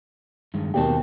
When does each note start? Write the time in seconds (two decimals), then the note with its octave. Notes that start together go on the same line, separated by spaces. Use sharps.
0.54 G2 D#3 G#3
0.74 D#2 B2 D#3 C4 G4 A5